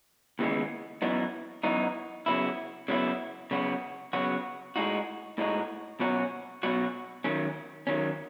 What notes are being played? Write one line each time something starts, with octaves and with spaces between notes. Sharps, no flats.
D#2 C#3 E3 G#3 B3
F#2 E3 B3 D#4 F#4
F#2 E3 B3 D#4 F#4
C#3 F#3 B3 E4
C#3 F#3 B3 E4
C#3 F#3 B3 F#4
C#3 F#3 B3 F#4
A2 G#3 D#4 F#4
A2 G#3 D#4 F#4
B2 F#3 C#4 F#4
B2 F#3 C#4 F#4
D#3 F#3 C#4
D#3 F#3 C#4